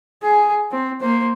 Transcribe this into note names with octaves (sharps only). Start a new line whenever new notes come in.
G#4
C4
A#3 C5